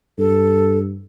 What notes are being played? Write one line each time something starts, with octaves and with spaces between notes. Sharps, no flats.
G2 A4